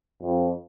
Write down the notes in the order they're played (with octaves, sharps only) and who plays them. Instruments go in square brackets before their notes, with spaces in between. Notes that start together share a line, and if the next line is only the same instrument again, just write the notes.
[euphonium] F2